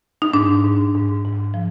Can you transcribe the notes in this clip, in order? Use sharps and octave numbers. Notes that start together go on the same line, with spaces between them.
D#4
G#2 D4
G#2
G#2
G#2
F3